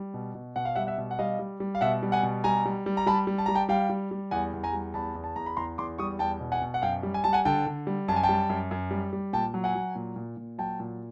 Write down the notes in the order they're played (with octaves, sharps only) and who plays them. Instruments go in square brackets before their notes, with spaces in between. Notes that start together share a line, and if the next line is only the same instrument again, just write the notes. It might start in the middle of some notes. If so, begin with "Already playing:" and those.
Already playing: [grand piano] G3
B2
B2
B2 F#5
F5
G3 E5 F#5
E5 F#5
B2
F#5
G3 D#5 F5
G3
G3
F5
B2 E5 F#5
G3
F#5 G#5
B2
G3 G#5 A#5
G3
G3
A#5
G3 A5 B5
G3
A5
G3 A#5
G5 A5
G3 F5 G5
G3
G3
E2 F#5 G#5
E2
G#5 A#5
G3
E2 A5 B5
E2
A5
E2 A#5
B5
E2 A#5 C6
E2 C6 D6
G3 C#6 D#6
E2 G5 A5
B2
F#5 G#5
B2
F#5
F#2 F5 G5
G3
G#5
G3 A5
F#5 G#5
D3 G5 A5
D3
G3
F#2 A5
G#5
G5 A5
G3
F#2
F#2
G3
G3
A#2 G5 A5
F#3
F#5 G#5
F#3
A#2
A#2
A#2
F#3 G5 A5
A#2